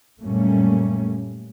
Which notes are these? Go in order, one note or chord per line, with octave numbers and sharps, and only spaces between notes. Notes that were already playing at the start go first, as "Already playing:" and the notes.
F#2 A#2 G3 A3 A#3 C#4